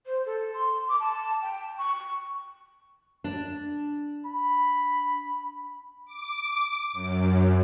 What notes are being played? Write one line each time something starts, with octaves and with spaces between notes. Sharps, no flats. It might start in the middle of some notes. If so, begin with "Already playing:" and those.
C5
A4
C6
D6
A5
G5
C#6
D4
B5
D6
F#2